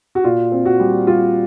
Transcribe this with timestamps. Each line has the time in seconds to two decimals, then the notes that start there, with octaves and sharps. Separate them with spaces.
0.15 F#4
0.24 A#2 F4
0.52 C4
0.65 F#4
0.80 G3
1.07 G3 F4